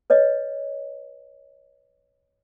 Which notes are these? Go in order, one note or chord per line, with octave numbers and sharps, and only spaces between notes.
B4 C#5 D#5